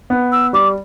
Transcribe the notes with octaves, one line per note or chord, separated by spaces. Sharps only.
B3
E6
G3 D6